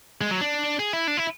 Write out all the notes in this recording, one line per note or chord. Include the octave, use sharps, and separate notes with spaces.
G#3
F#3
D4
G#4
E4
D4
E4